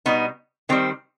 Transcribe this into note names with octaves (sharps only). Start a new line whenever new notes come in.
B2 G3 B3 D#4
D#3 G3 C4